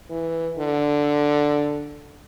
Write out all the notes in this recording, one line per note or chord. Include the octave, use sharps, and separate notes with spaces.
E3
D3